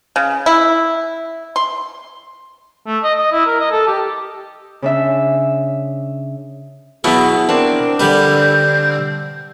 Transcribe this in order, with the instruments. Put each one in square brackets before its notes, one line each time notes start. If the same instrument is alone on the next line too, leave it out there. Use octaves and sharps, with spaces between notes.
[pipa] C#3
E4
C6
[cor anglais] A3
D#5
D#5
E4
A#4
D#5
A4
G4
[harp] C#3 D4 E5
[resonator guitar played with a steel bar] B2 F#3 [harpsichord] B3 E4 [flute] G#4
[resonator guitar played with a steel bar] C4 D4 [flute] A#4
[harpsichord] D3 G3 B4 [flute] G6